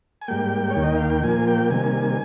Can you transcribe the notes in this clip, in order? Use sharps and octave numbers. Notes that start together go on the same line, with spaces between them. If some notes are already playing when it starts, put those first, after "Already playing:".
G#5
G#2 G3 A#3 G5
C#5
D#2 D#3 A#3
D#5
F5
G5
A#2 F3 A#3 G#5
G5
C3 D#3 G3 A#3 G#5